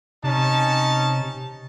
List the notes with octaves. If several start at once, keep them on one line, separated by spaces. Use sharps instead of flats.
C3 C#4 D#4 A5